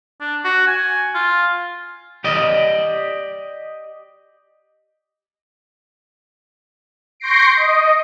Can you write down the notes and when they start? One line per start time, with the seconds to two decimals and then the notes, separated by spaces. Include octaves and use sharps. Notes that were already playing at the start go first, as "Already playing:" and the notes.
0.21 D4
0.45 F#4
0.67 G#5
1.15 F4
2.24 G4 D5 D#5
7.20 C6 C#6 G6 A#6 C7 D7
7.56 D#5